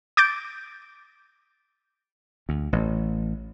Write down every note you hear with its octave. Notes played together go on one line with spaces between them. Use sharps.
D6 G6 A6 D7
D2
A1